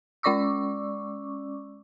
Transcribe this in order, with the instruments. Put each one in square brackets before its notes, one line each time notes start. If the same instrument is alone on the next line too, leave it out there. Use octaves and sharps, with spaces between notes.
[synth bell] G#3 C#4 D5 C#6 D6 E6